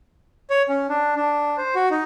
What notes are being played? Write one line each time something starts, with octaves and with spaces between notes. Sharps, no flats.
C#5
C#4
D4
D4
C5
F#4
D#4